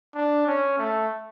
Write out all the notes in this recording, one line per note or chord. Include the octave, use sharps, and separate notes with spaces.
D4
C#4
A3